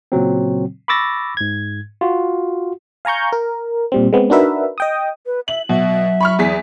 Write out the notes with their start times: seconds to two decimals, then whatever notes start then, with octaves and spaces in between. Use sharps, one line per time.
0.12 A#2 C#3 F#3 C4
0.88 B5 C#6 D6 E6 A6 A#6
1.37 G#2 G#6
2.01 F4 F#4
3.05 F5 G#5 A#5 C#6 G6
3.33 A#4
3.92 A#2 G3 C4
4.13 G#3 B3 C4
4.30 D4 D#4 F#4 A#4 B4 E5
4.78 D#5 G5 D#6
5.26 B4
5.48 E5 F#7
5.69 B2 F#3 E5
6.21 B5 C#6 F6
6.39 E2 G#4 B6